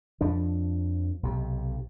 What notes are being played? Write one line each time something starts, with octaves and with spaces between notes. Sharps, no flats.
F2 F3 D4
B1 C3